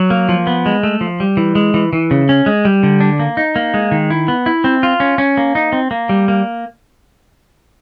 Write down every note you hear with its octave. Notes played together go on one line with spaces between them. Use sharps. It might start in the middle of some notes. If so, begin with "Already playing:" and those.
Already playing: F#3
A#3
F3
B3
G#3
A3
F3
G3
E3
G#3
E3
E3
C#3
C#4
G#3
G3
D3
D4
A#3
D#4
A#3
G#3
D#3
E4
B3
E4
C4
F4
C#4
C#4
A#3
D#4
C4
A#3
G3
A#3